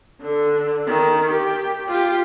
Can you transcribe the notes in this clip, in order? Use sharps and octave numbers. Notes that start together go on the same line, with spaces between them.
D3
D#3
G4
F4 G4